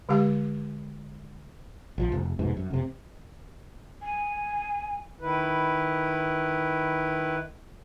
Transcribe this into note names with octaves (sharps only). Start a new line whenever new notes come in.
D3 G#3 G4 F5
A#1 F3
F1
F1 G#2 B2
F#2
F1 C3
G#5
D#3 E4 B4